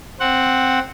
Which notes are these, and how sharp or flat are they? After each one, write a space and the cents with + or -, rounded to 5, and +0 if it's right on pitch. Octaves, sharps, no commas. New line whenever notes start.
C4 +0 F#5 +0